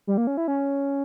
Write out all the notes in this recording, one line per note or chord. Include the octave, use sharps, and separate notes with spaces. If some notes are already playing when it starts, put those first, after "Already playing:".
G3
A#3
C#4
E4
C#4